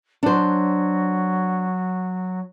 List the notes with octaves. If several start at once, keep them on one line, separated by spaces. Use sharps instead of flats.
F#3 D4 C5